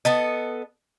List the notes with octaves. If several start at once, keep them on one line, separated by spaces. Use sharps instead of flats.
B3 A4 D#5